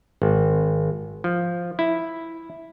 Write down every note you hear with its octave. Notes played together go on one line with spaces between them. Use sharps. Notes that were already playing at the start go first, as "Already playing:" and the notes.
G#1
F3
E4